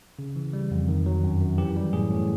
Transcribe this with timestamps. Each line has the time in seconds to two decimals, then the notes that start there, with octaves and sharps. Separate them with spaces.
0.19 C#3
0.36 E3
0.53 G3
0.71 F2
0.88 D#3
1.06 F#3
1.24 F#2
1.41 F#2
1.58 E3 G4
1.76 G3
1.93 A2 G#4
2.11 A2